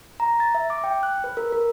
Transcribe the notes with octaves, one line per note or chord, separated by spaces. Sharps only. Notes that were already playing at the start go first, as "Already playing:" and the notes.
A#5
A6
E5
D6
G5
F#6
B4
A#4
A#4